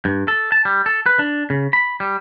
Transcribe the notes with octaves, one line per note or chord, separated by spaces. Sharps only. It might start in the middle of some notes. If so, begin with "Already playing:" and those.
G2
A4
A5
G3
A4
B4
D4
C#3
B5
G3